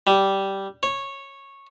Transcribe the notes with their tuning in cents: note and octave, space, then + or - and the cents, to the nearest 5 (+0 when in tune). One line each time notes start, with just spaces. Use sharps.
G3 -10
C#5 -10